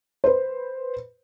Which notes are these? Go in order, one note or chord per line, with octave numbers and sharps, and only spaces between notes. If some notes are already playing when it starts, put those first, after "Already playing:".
B4 C5